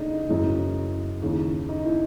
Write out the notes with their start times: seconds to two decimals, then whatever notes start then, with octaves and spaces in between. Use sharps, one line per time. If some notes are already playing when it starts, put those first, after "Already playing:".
Already playing: C#3 D4 D#4
0.29 F#2 C#3 E3
1.22 D#2 C#3 E3
1.69 D#4
1.84 E4